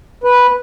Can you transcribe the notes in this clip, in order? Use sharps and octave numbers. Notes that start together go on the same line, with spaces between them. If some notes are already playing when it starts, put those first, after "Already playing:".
B4